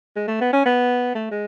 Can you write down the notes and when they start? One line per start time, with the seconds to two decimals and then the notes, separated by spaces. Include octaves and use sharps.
0.16 G#3
0.28 A3
0.41 B3
0.53 C#4
0.66 B3
1.15 A3
1.31 G#3